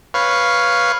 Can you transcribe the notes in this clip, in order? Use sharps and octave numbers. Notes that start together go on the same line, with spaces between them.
B4 C#5 F5